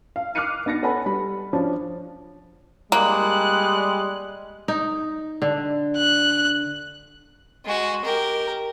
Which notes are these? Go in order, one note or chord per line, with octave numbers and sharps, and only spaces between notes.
F5
D6 F6 F#6 C7 C#7 D#7
B3 D#4 A6 A#6 C#7
A4 B4 C#5 F#5 G#5 B5
G3 B5
F3 C#4 D4
G3 G#3 A#3 F#6
D#4
D3
F#6
G#3 F#4
G4 A#4